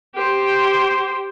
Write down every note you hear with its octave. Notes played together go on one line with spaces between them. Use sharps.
G4 C5